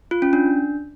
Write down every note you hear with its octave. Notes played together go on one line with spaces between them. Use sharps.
F4
C#4
D4